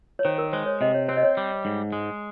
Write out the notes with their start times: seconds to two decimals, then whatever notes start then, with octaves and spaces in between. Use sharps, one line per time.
0.19 C#5
0.25 D#3 C5
0.38 A#4
0.53 G#3 C5
0.66 C#5
0.81 C3 D#5
0.94 C#5
1.08 C4 C5
1.17 D#5
1.23 C#5
1.37 G3
1.65 G#2
1.93 G#3